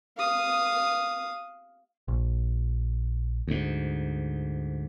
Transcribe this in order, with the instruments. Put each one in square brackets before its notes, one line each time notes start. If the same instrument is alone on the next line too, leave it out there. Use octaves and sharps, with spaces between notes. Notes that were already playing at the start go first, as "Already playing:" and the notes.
[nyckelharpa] F5 D#6
[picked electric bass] A#1
[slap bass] D2 G#2